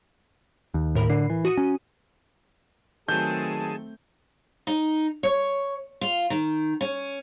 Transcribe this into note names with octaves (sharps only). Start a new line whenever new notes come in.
D#2
A2 A#4 B5
D3 C7
E3
F#4 D#6 D#7
C#4
D#3 F#3 A3 C4 G#4 G#5 A5 G6
D#4
C#5
F4
D#3
C#4